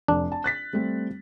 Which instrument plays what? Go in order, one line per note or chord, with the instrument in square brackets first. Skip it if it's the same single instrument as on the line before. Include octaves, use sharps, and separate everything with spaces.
[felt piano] F1 [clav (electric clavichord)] D4
[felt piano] A5
F#6 A6 B6
G3 A3 C4